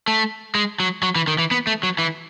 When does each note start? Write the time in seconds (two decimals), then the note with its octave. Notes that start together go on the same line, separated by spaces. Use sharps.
0.08 A3
0.55 G#3
0.80 F#3
1.03 F#3
1.16 E3
1.28 D#3
1.38 E3
1.51 B3
1.67 A3
1.83 F#3
1.99 E3